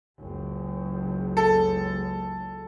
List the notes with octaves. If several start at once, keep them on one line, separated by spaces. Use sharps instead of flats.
F#1 C#2
A4